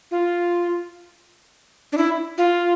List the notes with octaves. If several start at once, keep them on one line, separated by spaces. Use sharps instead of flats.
F4
D4
E4
F4